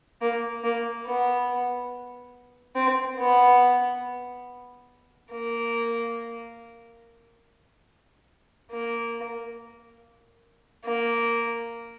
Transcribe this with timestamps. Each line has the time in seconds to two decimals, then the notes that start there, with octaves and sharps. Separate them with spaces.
0.22 A#3
0.64 A#3
1.06 B3
2.76 C4
3.19 B3
5.31 A#3
8.72 A#3
10.85 A#3